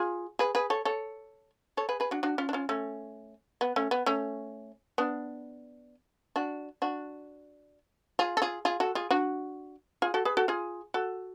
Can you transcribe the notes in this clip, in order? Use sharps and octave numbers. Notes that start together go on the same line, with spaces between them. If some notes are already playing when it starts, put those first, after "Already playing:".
Already playing: F4 G#4
G#4 B4
G#4 B4
A4 C#5
A4 C#5
A4 C#5
G#4 B4
G#4 B4
D4 F#4
D4 F#4
C#4 F4
D4
C#4 F4
A3 C#4
B3
A3 C#4
B3
A3 C#4
B3 D4
D4 F#4
D4 F#4
F4 G#4
A4
F4 G#4
F4 G#4
F#4 A4
F4 G#4
D4 F#4
F4 G#4
F#4 A4
G#4 B4
F#4 A4
F4 G#4
F#4 A4